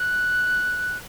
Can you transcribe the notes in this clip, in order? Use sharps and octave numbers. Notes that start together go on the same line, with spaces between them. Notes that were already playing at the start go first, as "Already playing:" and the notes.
Already playing: F#6